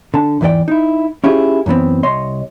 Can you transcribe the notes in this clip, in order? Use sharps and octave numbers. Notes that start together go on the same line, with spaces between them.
D3 A5
E2 G#2 E3 G4 D5 G5
D#4 E4
C#4 E4 F4 G4 G#4
F#2 E3 B3 C4
C2 C#5 D#5 C6